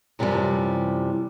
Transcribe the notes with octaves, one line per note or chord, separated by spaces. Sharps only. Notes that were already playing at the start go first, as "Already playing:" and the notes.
F#2 C3 E3 F3 G3